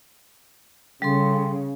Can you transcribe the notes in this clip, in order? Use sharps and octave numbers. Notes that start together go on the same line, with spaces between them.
C#3 G3 A4 C6